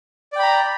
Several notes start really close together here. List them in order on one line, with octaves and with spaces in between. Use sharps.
D5 G5 B5 A#5